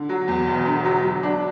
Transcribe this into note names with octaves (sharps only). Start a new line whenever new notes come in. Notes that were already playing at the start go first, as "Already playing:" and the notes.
Already playing: D3
F#3
E2
E1
D3
F#3
F#3
D4